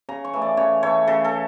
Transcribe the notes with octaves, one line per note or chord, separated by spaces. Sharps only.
C#3 A#5
C#6
E3 A3
D5
C#3 C#5
E3 A3 C#5
C#3 A4
A4